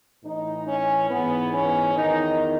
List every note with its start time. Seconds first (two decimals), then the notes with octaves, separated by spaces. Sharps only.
0.24 A2 E3 D#4
0.67 C#4
1.10 G#2 E3 B3
1.53 C#4
1.96 E2 D#3 D#4